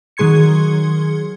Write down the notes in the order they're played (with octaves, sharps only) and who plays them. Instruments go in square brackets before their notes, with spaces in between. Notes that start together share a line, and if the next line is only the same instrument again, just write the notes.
[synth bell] D#3 F#3 G#4 C6 G#6 C#7